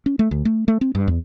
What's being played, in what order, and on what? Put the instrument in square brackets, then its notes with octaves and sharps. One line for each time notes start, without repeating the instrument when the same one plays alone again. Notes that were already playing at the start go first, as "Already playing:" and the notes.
[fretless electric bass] C#4
A3
D2
A3
A3
C4
G2
E2